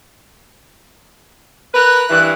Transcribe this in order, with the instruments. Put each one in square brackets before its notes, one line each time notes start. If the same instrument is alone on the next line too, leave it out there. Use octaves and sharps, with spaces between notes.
[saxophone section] A#4 B4 [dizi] F#6
[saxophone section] G2 E3